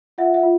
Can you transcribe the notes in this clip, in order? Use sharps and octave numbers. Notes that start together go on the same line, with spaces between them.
F4 E5 F#5
E5 F#5
F4